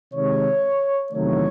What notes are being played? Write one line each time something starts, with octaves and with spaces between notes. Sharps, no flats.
C3 D#3 G#3 C#5
E2 C3 D#3 F#3 A3 C#5